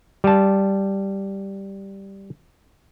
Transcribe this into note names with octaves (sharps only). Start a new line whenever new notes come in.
G3 A5